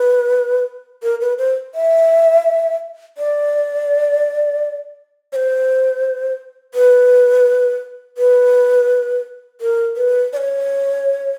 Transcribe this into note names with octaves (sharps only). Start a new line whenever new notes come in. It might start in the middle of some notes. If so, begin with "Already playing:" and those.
Already playing: B4
A#4
B4
C5
E5
D5
C#5
C5
B4
B4
A#4
B4
D5
C#5